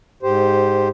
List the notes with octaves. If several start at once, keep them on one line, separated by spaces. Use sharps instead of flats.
G#2 G4 C5